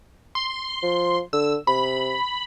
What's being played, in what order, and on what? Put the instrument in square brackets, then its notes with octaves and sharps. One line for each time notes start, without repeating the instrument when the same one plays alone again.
[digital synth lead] C6
[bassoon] F3
[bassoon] D3 [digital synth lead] E6
[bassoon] C3 [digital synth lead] B5